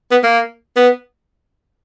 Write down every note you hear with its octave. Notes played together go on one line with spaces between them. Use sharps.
B3
A#3
B3